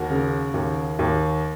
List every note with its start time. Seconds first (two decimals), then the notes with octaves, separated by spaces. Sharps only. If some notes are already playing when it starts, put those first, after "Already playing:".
Already playing: D#2 F#4 A#4
0.10 C#3
0.54 D#2
0.99 D#2